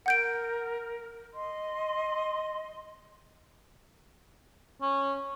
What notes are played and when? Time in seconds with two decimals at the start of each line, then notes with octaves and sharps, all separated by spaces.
0.06 A#4 F#5 G6 D7
1.33 D#5 C6
4.82 C#4